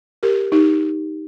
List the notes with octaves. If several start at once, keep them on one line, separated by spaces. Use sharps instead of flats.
G4 A#4
D#4 G4